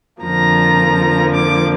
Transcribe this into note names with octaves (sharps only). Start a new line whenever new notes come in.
F2 D3 F3 A#3 A#5
D6